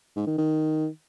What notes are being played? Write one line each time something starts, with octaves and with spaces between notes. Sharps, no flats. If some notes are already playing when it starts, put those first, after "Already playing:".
G#2
D#3
D#3